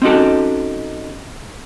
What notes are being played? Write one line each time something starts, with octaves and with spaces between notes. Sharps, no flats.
C4 C#4 D#4 F#4 G4 A4